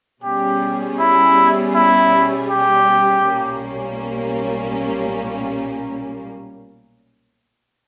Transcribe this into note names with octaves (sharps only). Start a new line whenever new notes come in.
B2 G3 C#4 G4 G#4
E4
E4
G4
B1 A#2 G3 A#3 C#4